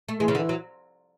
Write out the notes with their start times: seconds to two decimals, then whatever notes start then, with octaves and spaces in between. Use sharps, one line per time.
0.09 A3
0.20 E3 G#3
0.28 C#3
0.35 D3
0.39 E3
0.49 F#3